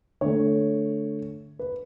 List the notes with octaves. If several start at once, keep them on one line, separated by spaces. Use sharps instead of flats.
D3 A3 C#5
B4